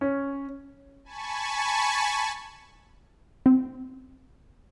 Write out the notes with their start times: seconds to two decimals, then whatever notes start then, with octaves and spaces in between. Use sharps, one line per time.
0.01 C#4
1.04 G#5 A5 B5 C#6
3.46 C4